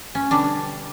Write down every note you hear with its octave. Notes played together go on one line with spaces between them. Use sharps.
C#4
B2 D3 G3 D4